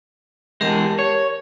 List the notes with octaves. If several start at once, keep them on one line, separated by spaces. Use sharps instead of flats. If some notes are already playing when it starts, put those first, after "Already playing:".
E2 G#3 G4 A#4 A5
C#5